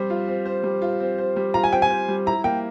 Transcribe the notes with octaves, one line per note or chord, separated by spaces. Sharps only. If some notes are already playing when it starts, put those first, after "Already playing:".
Already playing: G3 C4 C5
F4
C4
C5
G3
F4
C4
C5
G3
F4 A#5
G#5
C4 G5
G#5
C5
G3
E4 A#5
A#3 G5